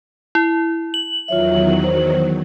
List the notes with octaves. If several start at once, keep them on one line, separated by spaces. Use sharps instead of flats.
E4
F#7
E2 D#3 F#3 F4 C#5 E5
C5